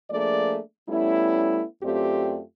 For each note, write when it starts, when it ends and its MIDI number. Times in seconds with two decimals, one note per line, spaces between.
0.11 0.59 53
0.11 0.59 57
0.11 0.59 58
0.11 0.59 62
0.11 0.59 68
0.11 0.59 74
0.89 1.64 55
0.89 1.64 57
0.89 1.64 59
0.89 1.64 61
0.89 1.64 64
1.83 2.40 42
1.83 2.40 57
1.83 2.40 60
1.83 2.40 65
1.83 2.40 67
1.83 2.40 74